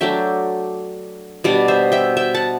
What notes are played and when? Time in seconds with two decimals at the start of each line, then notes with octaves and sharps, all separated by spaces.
0.01 F#3 A3 D4 E5 G5
1.44 B2 G3 D4 D5 F#5
1.68 C5 E5
1.92 E5 G5
2.17 E5 G5
2.34 F#5 A5